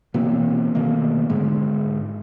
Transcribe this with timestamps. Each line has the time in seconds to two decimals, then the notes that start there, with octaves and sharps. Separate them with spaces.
0.14 B2 E3 A#3 C4
0.75 B2 D#3 A3 A#3
1.30 G#2 D3 G#3